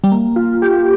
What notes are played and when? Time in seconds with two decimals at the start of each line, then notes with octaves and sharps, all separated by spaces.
0.04 G3
0.12 A#3
0.36 F4
0.62 G4